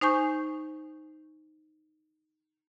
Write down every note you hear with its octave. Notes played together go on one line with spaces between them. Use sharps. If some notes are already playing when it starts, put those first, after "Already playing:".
D#4 C5 G#5 C#6 G6